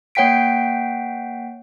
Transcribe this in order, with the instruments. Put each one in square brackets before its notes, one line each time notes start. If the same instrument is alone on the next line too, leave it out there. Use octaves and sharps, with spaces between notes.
[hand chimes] A#3 C#5 F#5 G5 B6 D7